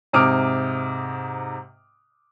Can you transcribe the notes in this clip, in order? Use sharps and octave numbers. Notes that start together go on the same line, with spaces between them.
G#2 C3 D6 D#6 F6 D7